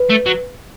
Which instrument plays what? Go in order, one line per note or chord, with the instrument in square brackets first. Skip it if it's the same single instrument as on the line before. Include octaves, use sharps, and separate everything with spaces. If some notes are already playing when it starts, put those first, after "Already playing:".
Already playing: [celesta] B4
[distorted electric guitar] A3
F#3